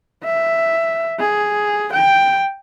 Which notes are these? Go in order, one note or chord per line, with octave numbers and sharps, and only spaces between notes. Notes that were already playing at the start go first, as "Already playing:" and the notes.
E5
G#4
G5